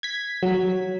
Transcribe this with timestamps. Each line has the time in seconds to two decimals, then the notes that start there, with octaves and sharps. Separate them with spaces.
0.03 G#6 B6
0.43 F#3